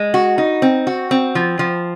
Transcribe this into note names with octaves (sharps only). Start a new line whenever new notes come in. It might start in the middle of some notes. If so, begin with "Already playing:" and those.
Already playing: G#3
F#4
D#4
C4
F#4
C4
F3
F3